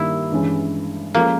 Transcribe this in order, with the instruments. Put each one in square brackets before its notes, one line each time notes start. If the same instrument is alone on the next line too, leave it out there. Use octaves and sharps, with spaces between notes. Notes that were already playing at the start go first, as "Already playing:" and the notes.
Already playing: [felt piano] G2 D#3 G3 A#3 [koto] E4
[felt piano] G2 E3 G#3 C#4
[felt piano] F3 G#3 C#4 F4 A4 [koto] A#3